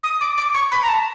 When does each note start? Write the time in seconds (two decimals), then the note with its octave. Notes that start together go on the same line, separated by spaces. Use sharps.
0.03 D#6
0.21 D6
0.37 D6
0.54 C#6
0.71 B5
0.82 A#5
0.88 A5